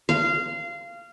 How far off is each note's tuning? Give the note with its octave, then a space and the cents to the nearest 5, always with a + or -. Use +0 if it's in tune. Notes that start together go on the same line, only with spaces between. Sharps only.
F5 -20